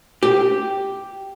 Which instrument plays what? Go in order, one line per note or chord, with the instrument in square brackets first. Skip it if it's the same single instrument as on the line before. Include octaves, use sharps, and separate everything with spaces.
[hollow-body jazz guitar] G4